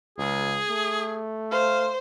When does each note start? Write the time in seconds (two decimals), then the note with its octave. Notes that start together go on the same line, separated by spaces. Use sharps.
0.18 C#2 G#4
0.70 A3
1.51 C5 F5